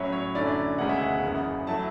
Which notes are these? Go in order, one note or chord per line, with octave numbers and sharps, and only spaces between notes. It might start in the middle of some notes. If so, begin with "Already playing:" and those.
Already playing: A2 F#3 C#4 E4 C#5
C#5
F#2 D3 A3 C#4 E4 D5
E1 D2 C#3 G#3 F#5
E5
F#5
F#1 E2 C#3
F#3 A3 E4 A5